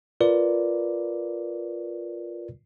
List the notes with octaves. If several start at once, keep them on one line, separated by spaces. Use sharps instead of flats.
F4 A#4 B4 D5